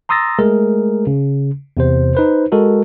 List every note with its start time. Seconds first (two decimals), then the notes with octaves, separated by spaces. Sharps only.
0.09 A#5 C6 D#6 E6 A6 A#6
0.39 G#3 A3 G#4 A#4
1.07 C#3
1.77 E2 C3 C5
2.15 D#4 B4 C5
2.52 G#3 F#4 A4 A#4